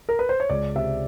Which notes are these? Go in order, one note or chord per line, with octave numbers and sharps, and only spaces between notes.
A#4
B4
C5
C#5
C#2 D5
C3 E5